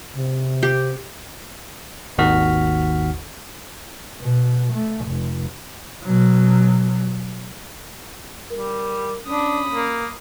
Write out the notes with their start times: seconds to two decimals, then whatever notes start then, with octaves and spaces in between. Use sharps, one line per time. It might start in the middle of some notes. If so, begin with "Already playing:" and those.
0.16 C3
0.63 G4
2.18 G#1 D#2 D#3 F#4 F6 B6
4.20 B2
4.73 A3
5.07 F1
6.03 B2 F#3
8.51 G3 A#4
9.27 C#4 D4 B5 D#6
9.71 A#3